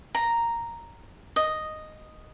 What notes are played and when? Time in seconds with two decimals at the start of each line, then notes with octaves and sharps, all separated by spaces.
0.15 A#5
1.36 D#5